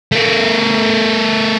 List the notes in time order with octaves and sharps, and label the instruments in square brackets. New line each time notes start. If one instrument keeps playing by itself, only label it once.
[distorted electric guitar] A3 A#4